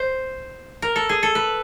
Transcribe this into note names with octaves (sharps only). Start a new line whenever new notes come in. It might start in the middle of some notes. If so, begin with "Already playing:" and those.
Already playing: C5
A#4
A4
G#4
A4
B4